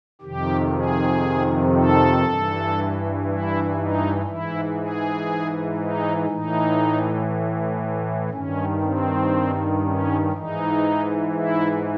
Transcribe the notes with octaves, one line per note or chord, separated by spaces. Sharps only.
F2 C3 D#3 G4
G#4
A4
G2 E3
E4
D#4
G#2 E3 E4
G#4
D#4
A2 E3 D#4
G2 D#3 C#4
C4
C#4
G#2 E3 D#4
E4